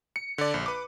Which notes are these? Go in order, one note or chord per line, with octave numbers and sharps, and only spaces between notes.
C#7
D3 D5
A#1
B4 D6